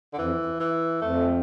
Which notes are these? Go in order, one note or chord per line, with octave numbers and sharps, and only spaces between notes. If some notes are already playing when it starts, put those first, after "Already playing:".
D3
F2 E3
F2
E3
F2 A3